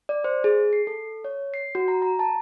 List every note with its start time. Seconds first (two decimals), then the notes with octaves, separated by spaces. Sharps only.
0.09 D5
0.24 C5
0.44 G#4
0.73 C7
0.87 A4
1.24 C#5
1.54 C7
1.75 F#4
1.88 A#5
2.02 A#5
2.19 A5